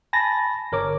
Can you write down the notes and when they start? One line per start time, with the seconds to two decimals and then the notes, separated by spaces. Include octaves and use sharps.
0.13 G#5 A5 B5 A6 A#6
0.72 G1 A#4 C#5 D6